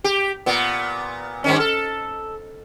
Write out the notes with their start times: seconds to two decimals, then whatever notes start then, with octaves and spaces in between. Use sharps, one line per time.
0.04 G4
0.46 A#2 B3
1.44 G2 D#3 C#4
1.60 A4